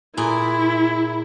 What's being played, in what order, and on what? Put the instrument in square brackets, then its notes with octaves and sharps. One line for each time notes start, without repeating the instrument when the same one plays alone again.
[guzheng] A#2 G#4 [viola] E4